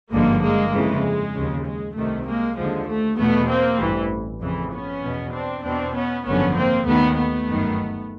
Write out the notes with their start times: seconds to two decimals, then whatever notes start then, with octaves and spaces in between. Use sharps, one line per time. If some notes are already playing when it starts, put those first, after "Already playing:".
0.11 G#1 G2 D3 F3 G#3 A#3
0.42 G#3 A#3
0.73 F2 C#3 E3 G#3
1.35 D#2 C#3 F3
1.65 G#3
1.96 C2 C3 D#3 A3
2.27 G#3 A#3
2.57 D#2 D3 F3 G#3
2.88 A3
3.18 E2 B2 A3 B3
3.49 A#3 C4
3.80 A1 G2 E3
4.42 F2 C#3 E3
4.72 B3 C#4
5.04 E2 B2
5.33 C4 D4
5.64 E2 B2 C4 D4
5.95 B3 C#4
6.26 G#1 F#2 D3 F3 B3 C#4
6.57 A#3 C4
6.87 D#2 D#3 A3 B3
7.18 A3 B3
7.49 G1 F#2 D#3